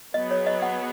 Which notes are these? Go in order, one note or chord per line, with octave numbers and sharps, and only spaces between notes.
F#3 B3 G#4 D#5
C#5
D#5
F#5